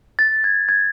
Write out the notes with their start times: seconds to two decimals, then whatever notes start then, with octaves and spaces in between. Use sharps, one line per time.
0.19 A6
0.44 G#6
0.69 G#6